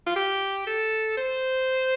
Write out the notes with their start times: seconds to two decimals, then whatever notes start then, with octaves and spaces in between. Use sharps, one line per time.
0.07 F4
0.16 G4
0.67 A4
1.17 C5